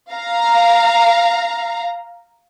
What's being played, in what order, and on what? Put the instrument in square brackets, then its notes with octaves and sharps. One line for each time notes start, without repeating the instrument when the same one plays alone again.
[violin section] F5 A#5